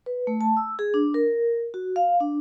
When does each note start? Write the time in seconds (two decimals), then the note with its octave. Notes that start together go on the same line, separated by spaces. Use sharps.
0.06 B4
0.27 A3
0.41 A5
0.57 E6
0.79 G#4
0.94 D4
1.14 A#4
1.74 F#4
1.96 F5
2.21 D4